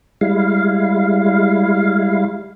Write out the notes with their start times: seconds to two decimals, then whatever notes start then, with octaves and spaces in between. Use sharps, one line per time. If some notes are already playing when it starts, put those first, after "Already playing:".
0.21 G3 G#3 E4 F5